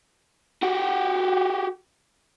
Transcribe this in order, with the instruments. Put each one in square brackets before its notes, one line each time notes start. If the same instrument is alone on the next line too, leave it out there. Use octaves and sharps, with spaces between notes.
[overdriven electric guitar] F#4 G4